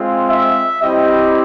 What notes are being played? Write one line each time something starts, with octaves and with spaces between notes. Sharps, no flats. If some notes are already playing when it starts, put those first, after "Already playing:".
Already playing: G#3 C4 F4
E5
G3 C4 E4 G4 D#5